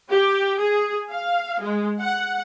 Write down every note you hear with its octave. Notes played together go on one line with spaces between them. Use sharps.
G4
G#4
F5
G#3
F#5